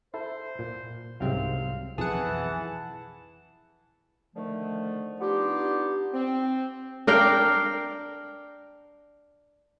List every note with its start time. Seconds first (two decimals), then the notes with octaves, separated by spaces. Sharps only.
0.14 E4 A4 C5
0.59 A#2
1.20 C2 G#2 C3 F#3 C4 F5
1.98 B1 F2 E3 G#4 F#5 A5
4.36 D3 D#3 F3 A3
5.20 B3 D4 D#4 F4 G4
6.13 C4
7.07 D4 A#4 F5 G5